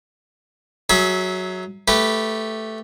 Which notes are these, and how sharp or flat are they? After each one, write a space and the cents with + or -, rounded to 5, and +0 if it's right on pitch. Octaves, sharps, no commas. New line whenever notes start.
F#3 +0 G#4 +20 E5 -20
A3 +0 G4 +0 B4 +0